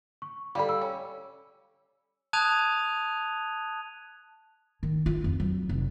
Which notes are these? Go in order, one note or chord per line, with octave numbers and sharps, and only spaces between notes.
C#6
G3 A4 D5 F5 B5
E6
C#4
A5 D#6 F#6 G#6 D#7 F7
D#3
F4
F2
F#3
F1